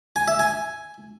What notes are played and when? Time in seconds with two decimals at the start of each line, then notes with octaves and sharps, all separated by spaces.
0.16 G#5
0.28 E5
0.39 G#5